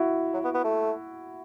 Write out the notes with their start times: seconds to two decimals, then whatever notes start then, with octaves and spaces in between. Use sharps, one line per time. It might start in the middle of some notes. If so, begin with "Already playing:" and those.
Already playing: E4 F#4
0.34 F#3
0.44 B3
0.54 B3
0.64 A3